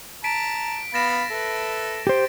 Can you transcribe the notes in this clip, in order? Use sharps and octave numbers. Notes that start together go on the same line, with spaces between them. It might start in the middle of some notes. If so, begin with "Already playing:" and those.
A5 A#5 B6 D7
B3 F5 B5 A6 A#6 E7
A4 B4 E5
G4 C5 D7